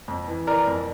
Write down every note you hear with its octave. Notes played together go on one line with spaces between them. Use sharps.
F2
E3
E3 A#4 D5
F2